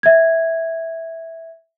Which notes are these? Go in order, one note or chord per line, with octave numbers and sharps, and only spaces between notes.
E5 G#6